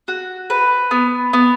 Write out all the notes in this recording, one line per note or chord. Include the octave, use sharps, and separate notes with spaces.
F#4
B4
B3
B3